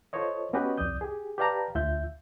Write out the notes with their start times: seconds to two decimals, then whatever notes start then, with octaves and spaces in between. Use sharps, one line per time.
0.13 F4 A4 C5 C#5 D#5
0.53 B3 C#4 F#4 G4 B4 D#5
0.78 C2 F2 D5 D#6 G6
1.01 G4 G#4
1.38 G4 B4 D5 F5 A5 A#5
1.75 D2 F4 E5 G6